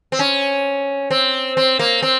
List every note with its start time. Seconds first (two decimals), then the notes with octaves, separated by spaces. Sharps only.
0.12 C4
0.19 C#4
1.11 C4
1.57 C4
1.79 A#3
2.02 C4